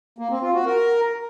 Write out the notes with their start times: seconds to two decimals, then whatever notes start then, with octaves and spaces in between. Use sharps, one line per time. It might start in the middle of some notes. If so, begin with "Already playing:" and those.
0.18 A#3
0.30 C4
0.42 F4
0.54 F#4
0.66 A#4